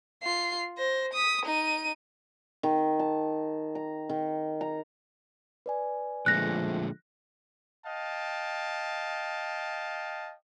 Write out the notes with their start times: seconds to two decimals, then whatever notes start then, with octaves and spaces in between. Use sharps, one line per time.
0.23 F4 C7
0.77 C5 A#6
1.14 D#6 B6
1.46 D#4 D#7
2.63 D#3
2.99 A5
3.75 A#5
4.09 D#3
4.61 A#5
5.66 B4 D5 G#5
6.26 A#2 D3 F3 G#3 A3 F#6 A#6
7.85 D#5 F5 G5 A5